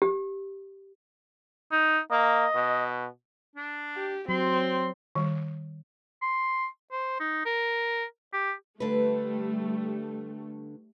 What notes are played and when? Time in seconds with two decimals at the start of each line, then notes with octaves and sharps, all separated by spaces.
0.02 G4
1.72 D#4
2.11 A#3 D#5
2.55 B2
3.56 D4
3.97 G4
4.29 F#3 C4 C6
5.15 D#3 G3
6.22 C6
6.91 C5
7.20 D#4
7.46 A#4
8.33 G4
8.80 D3 G3 A3 B4